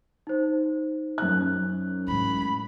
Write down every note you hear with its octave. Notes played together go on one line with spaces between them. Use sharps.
D#4 C5
F#2 F#6
A2 G#3 B5